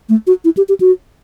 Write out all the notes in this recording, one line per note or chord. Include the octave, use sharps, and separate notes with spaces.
A3
F#4
E4
G4
G4
F#4